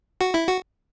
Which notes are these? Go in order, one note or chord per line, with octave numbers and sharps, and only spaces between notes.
F#4
E4
F#4